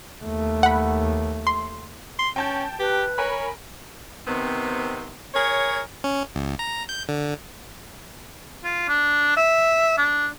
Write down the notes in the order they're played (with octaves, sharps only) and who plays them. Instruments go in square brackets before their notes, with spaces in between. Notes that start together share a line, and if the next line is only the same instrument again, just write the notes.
[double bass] D#2 A3
[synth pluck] F#5 B5
C6
[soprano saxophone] C6
[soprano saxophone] C#4 [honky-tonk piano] G5 A5 G6
[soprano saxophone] G4 [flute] B4
[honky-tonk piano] A#4 G#5 B5 [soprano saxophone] C#5
[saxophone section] C3 D#3 B3 C4
G#4 A#4 C#5
[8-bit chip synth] C#4
C#2
A#5
G6
D3
[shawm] F4
D4
E5
D4